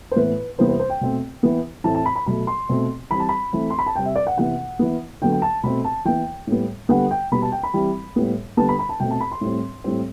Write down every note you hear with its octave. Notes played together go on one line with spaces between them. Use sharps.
C5
A2 E3 B3 B4
C3 E3 G3 B3 C5
C5
C5
G5
B2 A3 C4
E3 B3
A2 E3 A3 C4 A5
A5
B5
B5
B2 F#3 A3 B5
C6
B2 A3 C4
E3 G3 C4 B5
A5
B5
E3 A3 C4
C6
B5
A5
C3 G3 C4 G5
E5
D5
F#5
C3 E3 B3 F#5
E3 B3
D3 F#3 B3 G5
G5
A5
B2 A3 C4 B5
A5
E3 B3 G5
A2 G3 B3
D3 G3 B3 F#5
G5
B2 G3 B3 B5
A5
G5
B5
E3 G3 C4
A2 G3 B3
D3 G3 B3 A5
B5
B5
A5
B2 A3 C4 G5
A5
B5
C6
A2 G3 C4
A2 G3 C4